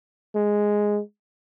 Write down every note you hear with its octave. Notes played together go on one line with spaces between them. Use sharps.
G#3